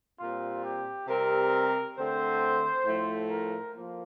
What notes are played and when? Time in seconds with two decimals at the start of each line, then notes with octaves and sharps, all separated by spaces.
0.19 A#2 G3 C4 F4
0.63 G4
1.07 C3 G3 C4 A#4
1.97 D3 A3 C4 C5
2.86 A2 F3 A3
3.30 A#4
3.74 F3 A#3